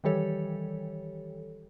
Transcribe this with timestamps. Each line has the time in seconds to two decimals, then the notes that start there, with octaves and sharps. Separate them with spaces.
0.04 D#3 E3 G3 G4 A4 C#5